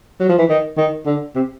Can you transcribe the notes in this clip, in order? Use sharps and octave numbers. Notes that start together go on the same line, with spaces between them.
F#3
F3
E3
D#3
D#3
D3
C3